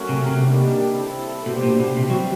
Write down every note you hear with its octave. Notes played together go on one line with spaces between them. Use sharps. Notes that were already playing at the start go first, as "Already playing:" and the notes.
Already playing: F#3 A3 C#4 F#4 A#4
C3
C3
D#3 G3 A#3 D4 G4
C4 E4 A4
B2 B3 D4 G4 C5
A#2
B2
C3 E3 G3 C4
F#3